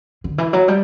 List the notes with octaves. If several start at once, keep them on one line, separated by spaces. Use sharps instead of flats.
D3
E3
F#3
G3